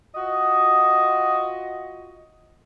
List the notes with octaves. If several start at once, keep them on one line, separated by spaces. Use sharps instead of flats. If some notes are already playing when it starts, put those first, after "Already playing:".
F4 F#4 D#5